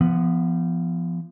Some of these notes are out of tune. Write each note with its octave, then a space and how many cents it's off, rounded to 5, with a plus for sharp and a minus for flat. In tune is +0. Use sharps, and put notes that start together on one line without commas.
F3 -30 B3 +0